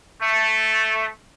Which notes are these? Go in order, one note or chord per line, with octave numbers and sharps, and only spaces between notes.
A3